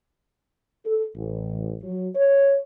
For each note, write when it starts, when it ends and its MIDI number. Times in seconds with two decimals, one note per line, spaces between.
0.86 1.07 69
1.15 1.75 33
1.83 2.09 54
2.16 2.60 73